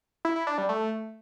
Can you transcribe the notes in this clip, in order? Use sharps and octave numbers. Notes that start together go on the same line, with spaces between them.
E4
E4
D4
G3
A3